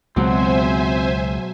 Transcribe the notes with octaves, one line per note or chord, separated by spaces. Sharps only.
C#2 B2 F#3 G#3 C4 C5 E5 G#5